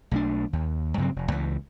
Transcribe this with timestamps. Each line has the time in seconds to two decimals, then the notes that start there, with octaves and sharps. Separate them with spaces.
0.11 B1 A3 D4
0.53 D#2
0.98 G2 C#3 F#3 C4
1.16 F1
1.32 C#2 E3